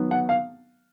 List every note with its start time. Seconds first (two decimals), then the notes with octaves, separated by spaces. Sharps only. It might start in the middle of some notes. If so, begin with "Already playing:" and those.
Already playing: D#3 F#3 B3
0.11 F#5
0.29 F5